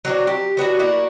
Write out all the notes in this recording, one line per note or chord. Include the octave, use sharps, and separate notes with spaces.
F#3 C4 D4 F#4
G4
F#3 B3 D4 F#4
A#3 E4 F#4 D5